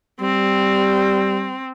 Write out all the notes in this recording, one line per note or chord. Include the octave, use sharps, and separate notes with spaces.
G3 C4